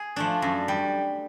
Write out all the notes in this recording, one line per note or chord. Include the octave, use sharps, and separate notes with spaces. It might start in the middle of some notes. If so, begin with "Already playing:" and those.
Already playing: G#4
F3 A3 D4
F#2
G3